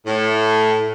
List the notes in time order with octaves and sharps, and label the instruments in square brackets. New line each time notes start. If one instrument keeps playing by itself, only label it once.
[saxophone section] A2